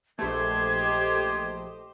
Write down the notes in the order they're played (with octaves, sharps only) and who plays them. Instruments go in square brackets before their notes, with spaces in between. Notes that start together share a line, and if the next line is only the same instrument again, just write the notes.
[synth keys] A#1 A3 [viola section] G4 C5 D#5 [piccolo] G#6